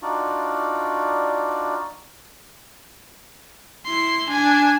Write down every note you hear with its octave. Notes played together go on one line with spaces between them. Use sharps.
D4 D#4 F4 F#4 D5
E4 C6
D4 G#5